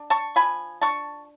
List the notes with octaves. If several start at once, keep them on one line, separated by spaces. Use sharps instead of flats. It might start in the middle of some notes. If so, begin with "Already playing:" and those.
Already playing: D4
A5 C#6
F3 G#5 B5
D4 A5 C#6